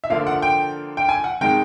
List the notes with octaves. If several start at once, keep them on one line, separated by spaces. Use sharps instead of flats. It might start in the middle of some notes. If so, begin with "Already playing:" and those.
E5
D3 F3 A#3 F5
F#5
G5
G5
G#5
F#5
C3 D#3 G#3 G5